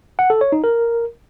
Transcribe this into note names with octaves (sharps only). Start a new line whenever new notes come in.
F#5
A4
C#5
D#4
A#4